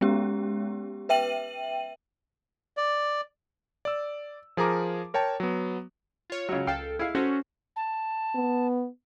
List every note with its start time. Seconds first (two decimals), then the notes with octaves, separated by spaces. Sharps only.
0.01 G#3 B3 C#4 G4
1.09 B4 E5 G5 D#7 F#7
2.77 D5
3.85 D5 E6
4.57 F3 G#4 A#4 A#5 D6
5.14 A#4 C#5 G5 A5
5.40 F#3 B3
6.30 F4 C#5
6.49 C#3 F#3
6.67 C#2 A4 F5 G5
6.99 E4 G#4 F5
7.15 C#4 F#4 A4 C5
7.76 A5
8.35 B3